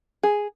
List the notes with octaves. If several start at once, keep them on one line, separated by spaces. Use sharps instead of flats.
G#4